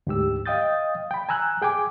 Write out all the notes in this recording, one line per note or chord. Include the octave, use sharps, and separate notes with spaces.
D2 G#2 G4 E6
D#5 F5 G5 D#6 G6 A6
G5 B5
G#5 A#5 E6 F#6 G6
G#4 G5 G#5 D6